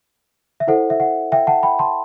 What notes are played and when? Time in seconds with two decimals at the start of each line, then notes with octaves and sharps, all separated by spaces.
0.60 E5
0.67 E4 A4 C5 F#5
0.90 E5
1.00 F#5
1.32 E5 G5
1.47 F#5 A5
1.63 G5 B5
1.79 A5 C6